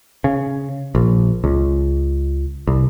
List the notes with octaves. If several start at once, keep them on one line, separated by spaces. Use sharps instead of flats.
C#3
A#1
C#2
C2